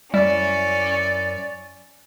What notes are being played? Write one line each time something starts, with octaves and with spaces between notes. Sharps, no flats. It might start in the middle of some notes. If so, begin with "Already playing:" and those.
F#2 G3 C#4 E4 D5